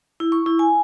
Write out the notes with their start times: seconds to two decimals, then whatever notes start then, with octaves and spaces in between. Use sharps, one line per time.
0.20 E4
0.32 C#6
0.46 E4
0.59 G#5